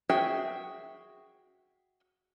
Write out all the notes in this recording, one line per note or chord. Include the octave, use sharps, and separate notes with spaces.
F#4 G#4 E5 G5